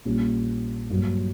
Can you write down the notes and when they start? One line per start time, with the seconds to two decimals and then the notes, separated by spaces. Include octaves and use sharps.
0.05 A#1 A#2 G3 C#4
0.90 G2 F#3 A#3